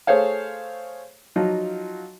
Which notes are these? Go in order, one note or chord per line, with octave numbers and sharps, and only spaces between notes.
A3 G#4 C5 C#5 F5
F3 F#3 D#4 F4